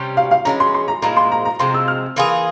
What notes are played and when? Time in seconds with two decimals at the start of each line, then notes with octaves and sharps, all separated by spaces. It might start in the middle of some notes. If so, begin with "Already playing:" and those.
Already playing: C3 G3 C#4
0.17 F5
0.31 F5
0.45 E3 G#3 C#4 A#5
0.60 C6
0.74 C6
0.88 A#5
1.02 A#2 F3 G#3 E4 A#5
1.17 C6
1.32 A#5
1.45 A#5
1.59 C3 F3 G#3 C6
1.74 E6
1.88 F6
2.16 E3 A#3 F4 G#4